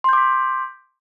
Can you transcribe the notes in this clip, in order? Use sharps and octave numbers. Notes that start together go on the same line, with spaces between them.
C6 D6 G6 B6